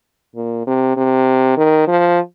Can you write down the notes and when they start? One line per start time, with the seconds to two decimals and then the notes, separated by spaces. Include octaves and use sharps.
0.36 A#2
0.67 C3
0.97 C3
1.57 D#3
1.88 F3